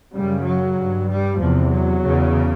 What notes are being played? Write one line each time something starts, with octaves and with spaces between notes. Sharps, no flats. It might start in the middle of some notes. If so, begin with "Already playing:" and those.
F#2 C#3 G3
F#3
G2
G3
E2 C3 F3
F#3
E2 C#3